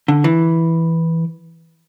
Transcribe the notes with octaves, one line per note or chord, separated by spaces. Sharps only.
D3
E3